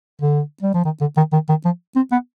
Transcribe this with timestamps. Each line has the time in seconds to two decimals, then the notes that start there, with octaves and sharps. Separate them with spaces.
0.22 D3
0.63 G3
0.74 F3
0.85 D#3
1.01 D3
1.17 D#3
1.33 D#3
1.49 D#3
1.65 F3
1.96 C4
2.12 B3